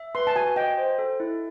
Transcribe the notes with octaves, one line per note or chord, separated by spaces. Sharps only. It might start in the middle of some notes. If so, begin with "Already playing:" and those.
Already playing: E5
B4 C6
A5
F#4 G#5
D#5 G5
C5
A4
E4